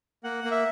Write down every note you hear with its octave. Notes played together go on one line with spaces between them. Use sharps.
A#3 F#5
A#3
E5